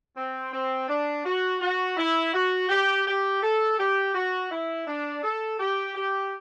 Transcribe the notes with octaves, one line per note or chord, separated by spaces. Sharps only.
C4
C4
D4
F#4
F#4
E4
F#4
G4
G4
A4
G4
F#4
E4
D4
A4
G4
G4